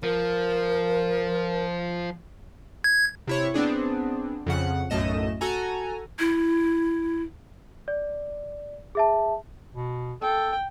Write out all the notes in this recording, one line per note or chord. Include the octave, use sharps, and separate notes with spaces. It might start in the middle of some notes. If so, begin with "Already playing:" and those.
F3 A#4
G#6
C3 E4 C#5
B3 C4 D4 G#4
F2 C#3 F#5
B1 F#2 A2 A3 D#5 E7
F#4 A4 G#5 A#5
E4
D5
G#4 E5 A5
B2
A4 G5